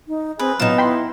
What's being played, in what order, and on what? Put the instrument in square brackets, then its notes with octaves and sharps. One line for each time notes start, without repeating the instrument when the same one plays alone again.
[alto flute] D#4
[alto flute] C4 [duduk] G#4 [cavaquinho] B4
[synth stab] A#1 E7 [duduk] F#3 [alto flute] B3 [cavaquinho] D#4 F4
[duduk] E4 [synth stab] G5 B5 C6